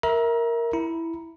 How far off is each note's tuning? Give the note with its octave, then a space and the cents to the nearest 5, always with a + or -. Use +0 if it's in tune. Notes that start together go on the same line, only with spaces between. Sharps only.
A#4 +0 E5 -15 A#5 +30
E4 +0 A#5 +10